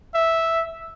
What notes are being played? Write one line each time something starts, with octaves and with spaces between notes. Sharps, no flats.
E5